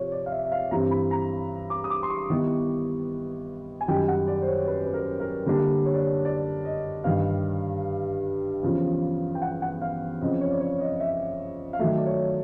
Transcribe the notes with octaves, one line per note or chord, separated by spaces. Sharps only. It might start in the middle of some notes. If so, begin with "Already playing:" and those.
Already playing: C3 F3 C#5
D5
F5
E5
E5
F5
G2 E3 G3 C4 A#5
B5
A#5
D6
D#6
D6
C6
C#6
D#3 G3 B3 E4
G#5
F#2 D#3 G3 G5
F#5
D5
C5
C#5
B4
B4
A#4
A#4
D3 G3 A#3 D4 A#4
C#5
D5
C#5
D5
D#5
G2 D#3 G3 F5
E2 C#3 F3
G5
F#5
F#5
F5
F2 C#3 F3 D#5
C#5
D5
C#5
D#5
E5
F5
D#3 F#3 A3 E5
D5
C#5